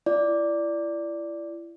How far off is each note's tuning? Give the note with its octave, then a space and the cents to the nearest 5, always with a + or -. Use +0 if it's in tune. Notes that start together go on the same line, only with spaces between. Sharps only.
E4 +35 D5 -5